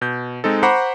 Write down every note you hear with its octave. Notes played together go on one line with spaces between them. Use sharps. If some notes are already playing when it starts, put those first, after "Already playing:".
B2 G6
G#3 C4 D#4 A4
C5 F#5 A#5 B5 C#6 D6